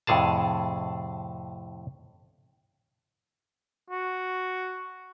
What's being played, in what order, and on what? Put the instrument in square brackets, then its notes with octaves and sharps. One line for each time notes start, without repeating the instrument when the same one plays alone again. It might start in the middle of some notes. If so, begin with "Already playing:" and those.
[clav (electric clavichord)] F2 A2 C3 G#4 A5
[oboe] F#4